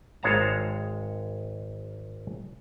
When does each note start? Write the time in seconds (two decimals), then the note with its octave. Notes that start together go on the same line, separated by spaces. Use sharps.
0.23 G#1 G#3 C#5 F5 A5 A#5